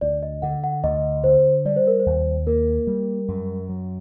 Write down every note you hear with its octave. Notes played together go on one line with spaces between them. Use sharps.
D2 D5
D#5
D3 F#5
F#5
D2 D#5
D3 C5
G3 D5
C5
A#4
C5
D#2
A#3 A#4
G3
F#2
F#3